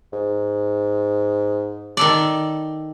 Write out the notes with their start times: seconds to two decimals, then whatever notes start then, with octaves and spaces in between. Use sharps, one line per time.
0.13 G#2
1.97 D#3 A4 D5